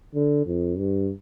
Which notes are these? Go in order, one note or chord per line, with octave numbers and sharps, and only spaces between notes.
D3
F2
G2